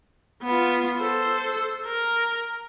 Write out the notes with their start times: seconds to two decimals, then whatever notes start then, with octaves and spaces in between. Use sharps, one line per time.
0.43 B3 F4
0.99 A4 C5
1.86 A#4